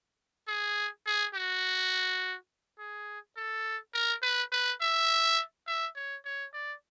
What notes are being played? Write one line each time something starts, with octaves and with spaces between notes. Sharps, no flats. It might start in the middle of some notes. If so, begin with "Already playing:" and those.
G#4
G#4
F#4
G#4
A4
A#4
B4
B4
E5
E5
C#5
C#5
D5